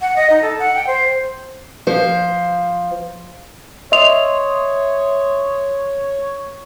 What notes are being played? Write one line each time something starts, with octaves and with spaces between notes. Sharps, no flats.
F#5
D#5
D#4
A4
F#5
G5
C5
F3 C5
C#5 D#5 E5 C6 D#6 F7